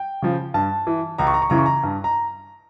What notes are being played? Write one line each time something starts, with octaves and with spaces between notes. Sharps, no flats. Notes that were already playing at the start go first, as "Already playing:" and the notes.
Already playing: G5
C#3 F3
G2 A5
E3
C#2 A#5
C#6
A#5
C#6
C#3 E3 A#5
C#6
A#5
G2
A#5